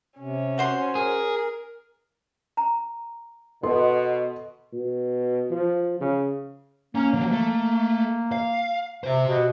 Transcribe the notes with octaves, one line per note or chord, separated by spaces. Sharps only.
C3 C#4
F#4 C5 C6
G#4 A#4
A#5
B2 A4 D#5 C6
B2
F3
C#3
A#3 C#4
F3 F#3
A3
F5
C3 G4 C5
B2